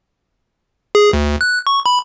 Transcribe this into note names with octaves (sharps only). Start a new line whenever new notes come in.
G#4
D2
F#6
C#6
B5